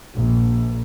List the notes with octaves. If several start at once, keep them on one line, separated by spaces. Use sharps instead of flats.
A#1